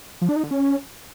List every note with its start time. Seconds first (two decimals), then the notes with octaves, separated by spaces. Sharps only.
0.21 F3
0.29 D4
0.36 D#4
0.44 D3
0.51 C#4